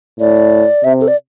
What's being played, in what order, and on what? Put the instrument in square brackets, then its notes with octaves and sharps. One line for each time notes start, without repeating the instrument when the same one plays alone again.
[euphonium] A2 [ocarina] D5
[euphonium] C3 [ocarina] E5
[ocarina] A4
D5